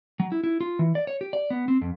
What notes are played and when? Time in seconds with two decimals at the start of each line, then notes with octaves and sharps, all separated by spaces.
0.20 F#3
0.32 E4
0.44 E4
0.61 F4
0.79 E3
0.95 D5
1.07 C#5
1.21 G4
1.33 D5
1.50 B3
1.68 C4
1.81 F2